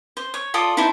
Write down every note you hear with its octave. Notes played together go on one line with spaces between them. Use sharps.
C5
C#5
F4 A4 D5 D#6
D#4 E4 C5 A5